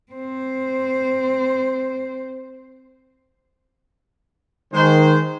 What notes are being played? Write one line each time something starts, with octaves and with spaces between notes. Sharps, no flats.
C4 C5
D#3 G#3 C5